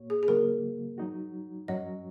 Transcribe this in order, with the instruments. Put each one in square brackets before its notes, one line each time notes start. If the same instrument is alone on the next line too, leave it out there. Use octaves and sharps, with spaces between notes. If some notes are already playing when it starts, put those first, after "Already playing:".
Already playing: [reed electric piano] A#2 A#3 F#4 C#5
[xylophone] G#4
G#4
[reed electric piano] C#3 F#3 A#3 F#4 [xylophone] A#4
[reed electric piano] F#3 D#4 F#4
[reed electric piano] F#2 F#3 C#4 F#4 [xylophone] D#5